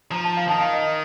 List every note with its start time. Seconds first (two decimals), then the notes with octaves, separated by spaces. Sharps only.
0.11 F3 A#5
0.24 A5
0.37 F5
0.48 D#3 A5
0.61 F5
0.73 D#5